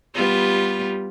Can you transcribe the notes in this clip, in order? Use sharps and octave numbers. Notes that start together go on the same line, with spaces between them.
G3 B3 F4